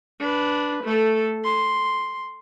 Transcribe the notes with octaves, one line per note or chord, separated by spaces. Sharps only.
D4 B4
A3 A4
C6